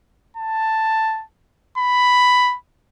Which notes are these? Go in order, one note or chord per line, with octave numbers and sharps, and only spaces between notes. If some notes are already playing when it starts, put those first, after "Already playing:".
A5
B5